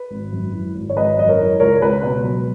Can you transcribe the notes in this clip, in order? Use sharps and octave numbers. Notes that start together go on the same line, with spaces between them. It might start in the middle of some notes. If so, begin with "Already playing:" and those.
Already playing: B4
G#1
F#2
E3
G#1
C#5
G#1 B4 D#5
F#2 D#5
A#4 C#5
E3
C#2 A#4 C#5
C#2 B4
B2 B4
F#3